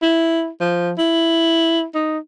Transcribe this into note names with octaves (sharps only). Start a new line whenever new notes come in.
E4
F3
E4
D#4